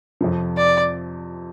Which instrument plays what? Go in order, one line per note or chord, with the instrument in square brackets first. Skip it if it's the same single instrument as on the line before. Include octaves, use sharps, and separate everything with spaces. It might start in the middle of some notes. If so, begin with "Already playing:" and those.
[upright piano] F2 C3 F3
[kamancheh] D5